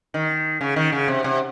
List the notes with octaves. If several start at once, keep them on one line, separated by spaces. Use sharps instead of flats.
D#3
C#3
D#3
C#3
C3
C3